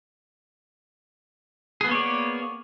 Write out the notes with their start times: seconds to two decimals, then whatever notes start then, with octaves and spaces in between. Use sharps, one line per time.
1.81 G#4
1.84 B3
1.88 A#3
1.91 C#5
1.95 D5